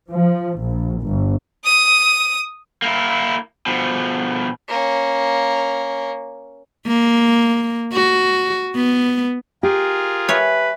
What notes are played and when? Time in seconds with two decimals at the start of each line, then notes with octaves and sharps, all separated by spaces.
0.10 F3
0.59 A#1
1.02 G1
1.64 D#6 D#7
2.82 A#3 E4
3.66 B2 F3
4.69 A#3 C#4
6.87 A#3
7.93 F#4
8.75 B3
9.63 F4 G4 G#4 A#4
10.29 B4 C#5 E5 G#5